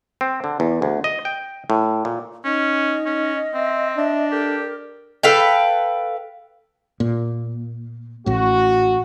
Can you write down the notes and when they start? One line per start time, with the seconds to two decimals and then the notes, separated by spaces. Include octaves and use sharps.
0.21 C4
0.44 D3
0.60 E2
0.82 D2
1.04 D#5
1.25 G5
1.70 A2
2.05 A#2
2.45 C#4 D#4 D#5
3.06 C#4
3.54 C4 E5
3.97 D4 E5
4.31 G4 A4 A#4
5.23 A4 B4 F5 G5
7.00 A#2
8.26 A1 A2 F#4